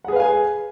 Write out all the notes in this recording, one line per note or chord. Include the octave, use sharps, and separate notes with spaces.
G#4 B4 F5 F#5 G#5